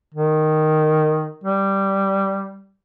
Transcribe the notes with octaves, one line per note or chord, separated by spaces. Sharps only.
D#3
G3